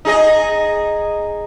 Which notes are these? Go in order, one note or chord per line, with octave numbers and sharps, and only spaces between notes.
D#4 G#4 D#5